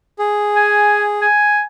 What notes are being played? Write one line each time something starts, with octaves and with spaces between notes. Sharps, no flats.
G#4
G#5
G#5